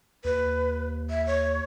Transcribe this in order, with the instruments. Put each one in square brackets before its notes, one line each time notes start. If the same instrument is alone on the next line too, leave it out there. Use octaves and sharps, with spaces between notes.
[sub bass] D#2 [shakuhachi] B4
[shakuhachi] E5
C#5